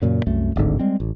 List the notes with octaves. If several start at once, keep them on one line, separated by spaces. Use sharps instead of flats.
F#2 A#2 C#3
C2 F#2 A3
D1 G#1 G#2 D3
G3 G#3 C4
A1